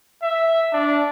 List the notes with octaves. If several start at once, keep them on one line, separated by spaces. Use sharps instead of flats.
E5
D4